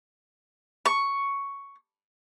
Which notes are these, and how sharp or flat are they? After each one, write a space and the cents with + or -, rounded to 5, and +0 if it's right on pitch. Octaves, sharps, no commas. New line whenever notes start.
C#6 +5